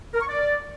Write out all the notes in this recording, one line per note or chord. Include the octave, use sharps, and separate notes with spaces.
A#4
C#6
D5